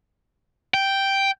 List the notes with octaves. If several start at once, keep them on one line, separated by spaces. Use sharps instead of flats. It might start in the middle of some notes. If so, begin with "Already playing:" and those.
G5